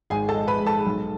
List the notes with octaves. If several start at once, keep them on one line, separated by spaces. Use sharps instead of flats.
G#1 G#4 G#5
A4 A5
G#3
B4 B5
G#2
A4 A5
B1